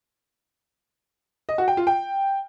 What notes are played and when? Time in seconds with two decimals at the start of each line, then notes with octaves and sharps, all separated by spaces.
1.49 D#5
1.58 F#4
1.68 G5
1.77 F4
1.87 G5